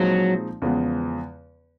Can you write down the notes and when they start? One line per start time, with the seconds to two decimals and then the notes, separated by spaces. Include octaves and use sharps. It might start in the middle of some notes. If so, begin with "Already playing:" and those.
Already playing: A#2 F3 F#3 G#3 C4 D#4
0.62 E2 C#3 F3 G#3 B3